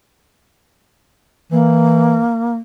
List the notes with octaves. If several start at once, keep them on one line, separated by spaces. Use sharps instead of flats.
E3 A#3